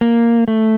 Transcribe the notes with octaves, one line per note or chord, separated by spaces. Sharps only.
A#3
A3